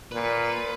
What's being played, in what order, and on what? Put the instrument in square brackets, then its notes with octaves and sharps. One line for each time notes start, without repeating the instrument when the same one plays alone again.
[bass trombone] A#2 [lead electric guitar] B4